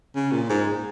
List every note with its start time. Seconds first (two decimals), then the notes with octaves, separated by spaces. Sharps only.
0.15 C#3
0.32 A#2
0.49 G#2